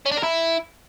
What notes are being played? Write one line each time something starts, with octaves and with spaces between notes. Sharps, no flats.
C#4
D4
A#4
E4